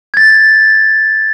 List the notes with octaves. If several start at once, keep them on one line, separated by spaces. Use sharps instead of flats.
G#6 A6